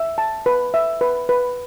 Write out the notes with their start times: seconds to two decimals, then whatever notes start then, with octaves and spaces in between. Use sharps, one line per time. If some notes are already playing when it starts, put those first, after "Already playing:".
Already playing: E5
0.18 A5
0.46 B4
0.74 E5
1.01 B4
1.29 B4